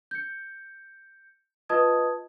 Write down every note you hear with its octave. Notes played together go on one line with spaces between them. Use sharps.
G6 C#7
F4 B4 D#5 A5 D#6 G#6